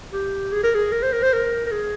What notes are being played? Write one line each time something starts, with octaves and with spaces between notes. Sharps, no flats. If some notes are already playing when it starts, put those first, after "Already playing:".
G4
G#4
A#4
G#4
A#4
C5
A#4
C5
A#4
A#4
G#4